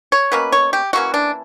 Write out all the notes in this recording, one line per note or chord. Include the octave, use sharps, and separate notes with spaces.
C#5
B2 A#3 C#4 B4
C#5
G4
E3 A#3 C#4 F#4
D4